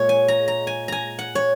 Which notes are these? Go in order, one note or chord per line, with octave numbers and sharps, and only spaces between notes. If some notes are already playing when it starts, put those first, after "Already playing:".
Already playing: A#2 G#3 C#5
G#5
A#5
A#5
G#5
G#5 A#5
F#5
C#5